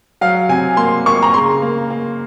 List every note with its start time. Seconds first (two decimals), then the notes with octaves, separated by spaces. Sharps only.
0.21 F#3 F5
0.49 C3 G#5
0.77 A#3 C6
1.06 A#3 C#6
1.23 A#5
1.34 C#3 C6
1.62 A#3
1.90 A#3